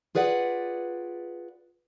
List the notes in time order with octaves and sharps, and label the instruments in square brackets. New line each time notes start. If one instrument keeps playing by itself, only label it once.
[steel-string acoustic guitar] F4 G#4 B4 D5 F#5